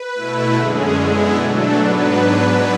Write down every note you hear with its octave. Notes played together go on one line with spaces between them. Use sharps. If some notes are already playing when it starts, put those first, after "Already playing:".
Already playing: B4
B2 A3 E4
F#2 D3 G#3 C#4 G#4
D3 G#3 B3 E4 G#4
B2 F#3 A3 D4 A4
G#2 F#3 B3 D4 B4